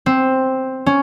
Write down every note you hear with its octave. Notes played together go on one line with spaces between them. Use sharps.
C4
C#4